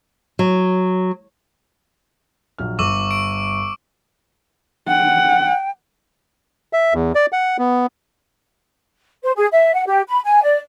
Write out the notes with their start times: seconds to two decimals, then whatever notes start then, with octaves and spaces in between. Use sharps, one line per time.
0.39 F#3
2.58 A#1 F#3 F6
2.79 G1 C#6 D6 E6
3.11 D7
4.88 F#5 G5
6.73 E5
6.94 E2
7.15 D5
7.32 F#5
7.58 B3
9.24 C5
9.36 G#4
9.53 E5
9.74 F#5
9.87 G4
10.08 B5
10.24 G#5
10.43 D5